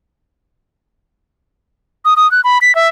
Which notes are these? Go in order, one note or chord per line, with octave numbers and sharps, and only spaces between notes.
D#6
D#6
F#6
B5
B6
E5